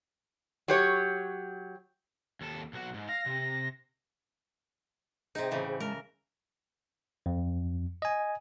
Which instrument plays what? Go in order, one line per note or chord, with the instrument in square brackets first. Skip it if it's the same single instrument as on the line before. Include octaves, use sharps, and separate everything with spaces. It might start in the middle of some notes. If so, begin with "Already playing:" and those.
[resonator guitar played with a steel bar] F#3 G4 C#5
[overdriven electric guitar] D#2 A4
B1 F#4
G#2
[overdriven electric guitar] F5 [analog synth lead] A#6
[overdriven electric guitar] C3
[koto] C3 D#4 [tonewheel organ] G#4 C5 G5
[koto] A2 C#3 E3
[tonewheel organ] G#3 A5 [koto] A#4
[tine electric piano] F2
D#5 G#5